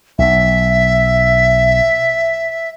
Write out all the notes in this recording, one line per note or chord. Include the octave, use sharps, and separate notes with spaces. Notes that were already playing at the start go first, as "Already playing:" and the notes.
B1 E5